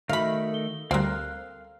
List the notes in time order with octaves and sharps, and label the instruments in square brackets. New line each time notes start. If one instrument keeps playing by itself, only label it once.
[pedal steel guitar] D#3 A3 D#4 [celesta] F#4 E5 [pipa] F5 B5
[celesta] A4 G7
[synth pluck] D2 G3 [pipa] A#3 C4 [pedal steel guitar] F5 F6 F#6